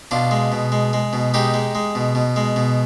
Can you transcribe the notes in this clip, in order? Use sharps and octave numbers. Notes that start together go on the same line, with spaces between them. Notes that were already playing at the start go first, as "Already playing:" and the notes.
B2 D4 F4
G#3
B2
G#3
G#3
B2
G#3 D#4 G4
G#3
G#3
B2
B2
G#3
B2